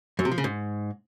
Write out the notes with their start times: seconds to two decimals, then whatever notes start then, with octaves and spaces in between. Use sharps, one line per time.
0.19 F#2
0.25 C3
0.31 F3
0.38 C#3
0.44 G#2